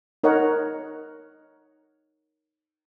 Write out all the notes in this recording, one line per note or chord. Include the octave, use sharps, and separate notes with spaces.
D#4 A#4 C#5 D#5 F#5